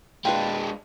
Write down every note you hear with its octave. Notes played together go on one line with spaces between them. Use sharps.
G#3 A#3 D4 F4 B4 C5 G5